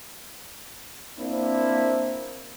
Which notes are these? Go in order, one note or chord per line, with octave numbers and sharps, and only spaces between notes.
A#3 C4 D4 E4